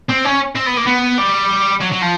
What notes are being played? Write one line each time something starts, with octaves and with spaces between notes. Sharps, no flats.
C4
C#4
C4
B3
A#3
B3
G3
F#3
F#3
F3